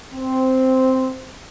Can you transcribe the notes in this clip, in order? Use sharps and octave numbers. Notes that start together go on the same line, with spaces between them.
C4